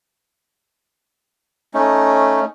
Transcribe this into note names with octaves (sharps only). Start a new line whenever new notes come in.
A3 C#4 D#4